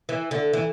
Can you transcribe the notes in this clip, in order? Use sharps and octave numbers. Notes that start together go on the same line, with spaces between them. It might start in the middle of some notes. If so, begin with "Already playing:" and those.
E3
D3
E3